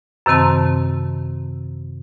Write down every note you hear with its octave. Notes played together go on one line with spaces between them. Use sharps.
F#2 C3 D#3 C4 A5